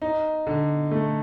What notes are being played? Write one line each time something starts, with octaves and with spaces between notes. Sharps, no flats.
D#4
D3
A3